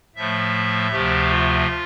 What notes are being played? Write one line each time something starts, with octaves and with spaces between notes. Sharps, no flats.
A2 F3 A3 E5
D2 C3 F3 A3 G4
F4